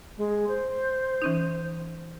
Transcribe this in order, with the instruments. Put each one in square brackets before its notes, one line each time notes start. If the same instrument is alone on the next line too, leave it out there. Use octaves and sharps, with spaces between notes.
[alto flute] G#3
C5
[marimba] E3 C#4 D#4